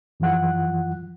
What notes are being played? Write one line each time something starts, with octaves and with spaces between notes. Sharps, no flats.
F#2 E3 F3 F4 F#5 F#6